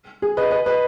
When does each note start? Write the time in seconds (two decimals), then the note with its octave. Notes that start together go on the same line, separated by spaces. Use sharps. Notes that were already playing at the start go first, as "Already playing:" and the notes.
0.22 G#4
0.37 B4 D#5
0.51 B4 D#5
0.66 B4 D#5